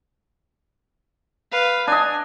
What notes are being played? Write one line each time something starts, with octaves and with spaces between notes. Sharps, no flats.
B4 F5
D4 D#5 G#5